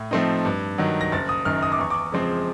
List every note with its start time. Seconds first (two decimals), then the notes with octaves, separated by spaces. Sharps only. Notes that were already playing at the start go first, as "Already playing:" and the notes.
Already playing: A2
0.11 F3 A3 C4 D#4
0.45 G2
0.78 D#3 F#3
1.01 A#6
1.12 F#1 A6
1.29 D#6
1.45 F#2 D#3 F6
1.63 D#6
1.72 D6
1.79 E2 C#6
1.90 D6
2.12 C#3 F3 G#3 C4